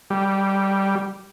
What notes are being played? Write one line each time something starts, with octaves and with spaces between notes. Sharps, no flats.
G3